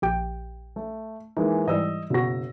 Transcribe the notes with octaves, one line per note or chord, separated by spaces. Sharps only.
A#1 G4 G5
A3
E3 G#3 A#3 D#4
G#2 E3 G3 D#5 E6
F#1 B2 F#4 A#6